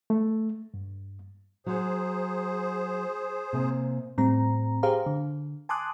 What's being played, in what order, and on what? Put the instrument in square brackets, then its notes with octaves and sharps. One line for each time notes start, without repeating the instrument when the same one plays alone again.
[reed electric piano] A3
G2
[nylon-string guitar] F#3 F#4 [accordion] G#4 C5
[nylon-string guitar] C3 A#3 G#5
[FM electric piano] A2 G3 C4 A#5
G4 G#4 C5 F5 A#5
D3
G#5 A5 C6 D6 D#6 F#6